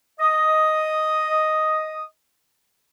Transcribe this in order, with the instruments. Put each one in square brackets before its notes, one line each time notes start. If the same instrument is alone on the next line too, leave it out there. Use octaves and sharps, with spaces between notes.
[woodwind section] D#5 D#6